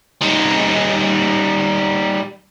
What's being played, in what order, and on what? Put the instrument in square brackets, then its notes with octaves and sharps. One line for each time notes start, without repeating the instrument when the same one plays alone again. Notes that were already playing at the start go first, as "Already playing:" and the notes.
[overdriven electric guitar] G3 D#4